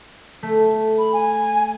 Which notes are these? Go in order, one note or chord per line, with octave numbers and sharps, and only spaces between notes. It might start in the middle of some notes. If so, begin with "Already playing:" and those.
A3
B5
G#5